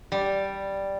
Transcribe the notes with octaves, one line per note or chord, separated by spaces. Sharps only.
G3